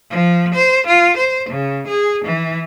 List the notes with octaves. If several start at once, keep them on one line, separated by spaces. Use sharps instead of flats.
F3
C5
F4
C5
C#3
G#4
E3